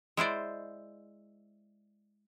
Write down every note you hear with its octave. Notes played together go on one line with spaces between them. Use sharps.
G#3 E4 C5 D5